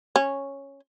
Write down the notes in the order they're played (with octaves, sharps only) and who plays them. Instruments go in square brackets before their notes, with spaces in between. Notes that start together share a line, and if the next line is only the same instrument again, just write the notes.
[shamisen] C#4